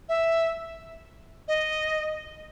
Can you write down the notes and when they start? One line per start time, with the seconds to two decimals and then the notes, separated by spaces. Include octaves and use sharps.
0.09 E5
1.48 D#5